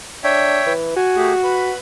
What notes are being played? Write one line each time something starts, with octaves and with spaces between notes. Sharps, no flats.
D4 C#5 E5 G5
E3
F#4 G#5
A3 G4 G#4
B4 B5